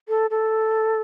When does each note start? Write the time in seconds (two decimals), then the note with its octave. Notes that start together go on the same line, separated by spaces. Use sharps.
0.08 A4
0.30 A4